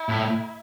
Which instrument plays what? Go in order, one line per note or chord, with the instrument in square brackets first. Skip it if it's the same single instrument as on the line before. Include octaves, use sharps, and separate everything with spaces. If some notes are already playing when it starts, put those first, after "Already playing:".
Already playing: [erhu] E4
[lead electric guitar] A2